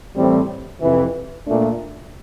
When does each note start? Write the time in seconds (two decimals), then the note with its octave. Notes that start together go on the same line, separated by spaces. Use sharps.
0.16 A2 E3 G3 C4
0.81 F2 C3 E3
1.45 A#2 A3 D4